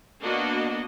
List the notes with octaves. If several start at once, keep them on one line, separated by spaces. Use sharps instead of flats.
A#3 B3 D4 F#4 D#5